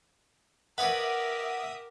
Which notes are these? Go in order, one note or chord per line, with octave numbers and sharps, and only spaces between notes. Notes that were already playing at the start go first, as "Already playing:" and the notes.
G4 A#4 B4 C#5 D5 E5 F#5 D#6